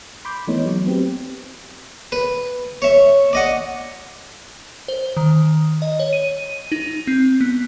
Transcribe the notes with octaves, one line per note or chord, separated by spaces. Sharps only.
B5 C6 D6 G6
E3 A3 B3 D#4 C#5
F#3
B3 C4 G4
B4
C#5 E5
D5 D#5 F#5
C5
D#3
D#5
C#5
D#7
D#4
C4
B3